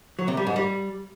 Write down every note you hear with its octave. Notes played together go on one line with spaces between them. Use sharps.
F#3
C3
G3
G#2
G3